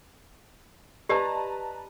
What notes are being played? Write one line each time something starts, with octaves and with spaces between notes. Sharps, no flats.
G4 B4 D5 D#5 A5 A#5